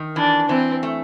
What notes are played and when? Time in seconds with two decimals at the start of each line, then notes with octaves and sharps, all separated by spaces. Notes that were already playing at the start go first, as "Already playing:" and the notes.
Already playing: D#3
0.16 E3 D4
0.49 E3 C4
0.83 A3